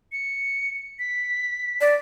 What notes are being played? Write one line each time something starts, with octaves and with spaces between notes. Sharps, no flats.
C#7
B6
D5